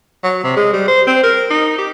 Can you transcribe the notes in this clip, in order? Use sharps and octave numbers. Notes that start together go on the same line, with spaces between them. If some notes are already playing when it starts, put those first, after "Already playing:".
F#3
C3
G#3
G3
C5
C4
A#4
D#4
G4